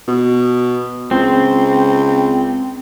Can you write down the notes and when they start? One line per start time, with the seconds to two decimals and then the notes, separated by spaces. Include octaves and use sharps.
0.08 B2
1.11 C#2 C4